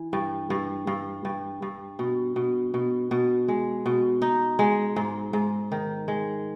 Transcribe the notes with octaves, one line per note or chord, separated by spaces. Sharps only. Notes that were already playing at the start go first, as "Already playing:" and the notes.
Already playing: E3
G2
G2
G2
G2
G2
B2
B2
B2
B2
G#3
B2
D#4
G#3
G#2
G#2
D#3
G#3